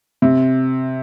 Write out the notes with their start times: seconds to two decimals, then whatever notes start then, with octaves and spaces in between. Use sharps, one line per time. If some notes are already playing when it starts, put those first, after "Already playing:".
0.22 C3